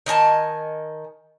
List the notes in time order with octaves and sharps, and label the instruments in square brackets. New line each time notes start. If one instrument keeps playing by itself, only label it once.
[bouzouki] D#3 D#5 G#5 A5